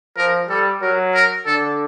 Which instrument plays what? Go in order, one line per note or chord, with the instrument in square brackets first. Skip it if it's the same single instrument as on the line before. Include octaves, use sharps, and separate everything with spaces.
[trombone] F3 [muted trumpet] A#4
[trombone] G3 [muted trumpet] A4
[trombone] F#3 [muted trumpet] A#4
[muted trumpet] A#4
[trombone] D3 [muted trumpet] A4